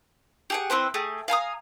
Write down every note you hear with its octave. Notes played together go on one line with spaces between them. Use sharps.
G4 G#4 F#5
C4 E4 B4 C5
A3 G4 G#4
F5 G#5 A#5 D#6